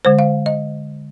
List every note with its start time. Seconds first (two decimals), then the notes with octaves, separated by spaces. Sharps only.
0.05 D3 G#3 C5
0.19 F5
0.46 D#5